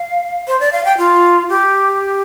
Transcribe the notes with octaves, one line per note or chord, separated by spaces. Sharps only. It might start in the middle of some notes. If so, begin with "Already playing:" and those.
Already playing: F5
C5
D5
F5
G5
F4
G4